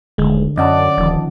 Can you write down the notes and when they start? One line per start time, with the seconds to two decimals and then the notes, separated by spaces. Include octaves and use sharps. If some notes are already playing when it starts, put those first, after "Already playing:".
0.18 D#1 D3 G#3
0.58 F#2 E3 C#4 D5 D#5 F#5 A5
0.98 D#1 D#3 F3